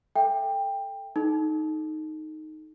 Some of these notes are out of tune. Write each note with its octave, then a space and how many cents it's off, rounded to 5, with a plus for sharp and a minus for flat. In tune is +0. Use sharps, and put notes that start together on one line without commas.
A4 +0 E5 +0 G5 +15
D#4 +0 A4 -35